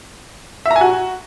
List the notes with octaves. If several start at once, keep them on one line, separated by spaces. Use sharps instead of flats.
E5
A#5
G#5
F#4